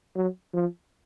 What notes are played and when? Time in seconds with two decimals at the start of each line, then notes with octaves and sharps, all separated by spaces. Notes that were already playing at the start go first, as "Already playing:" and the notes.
0.15 F#3
0.54 F3